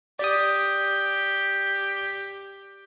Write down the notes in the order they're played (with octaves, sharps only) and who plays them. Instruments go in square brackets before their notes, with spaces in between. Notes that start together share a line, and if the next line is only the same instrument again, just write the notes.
[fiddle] G4 [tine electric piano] D5 D#6